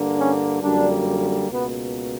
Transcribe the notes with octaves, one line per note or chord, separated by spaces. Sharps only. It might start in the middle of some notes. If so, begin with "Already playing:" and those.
Already playing: G2 D3 A#3
C#4
F#2 D3 G3 A#3 D4
C#2 B2 A#3 B3